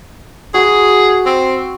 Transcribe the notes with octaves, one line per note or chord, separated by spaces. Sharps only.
F#4 G#4 B5
C4